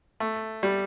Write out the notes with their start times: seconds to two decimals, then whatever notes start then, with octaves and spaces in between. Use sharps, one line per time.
0.20 A3
0.63 G3